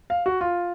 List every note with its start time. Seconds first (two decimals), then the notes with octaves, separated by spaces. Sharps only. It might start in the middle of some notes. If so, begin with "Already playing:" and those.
0.10 F5
0.26 F#4
0.41 F4